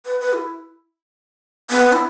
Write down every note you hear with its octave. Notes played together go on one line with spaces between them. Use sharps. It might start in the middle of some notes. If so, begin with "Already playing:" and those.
B4
B4
E4
B3
E4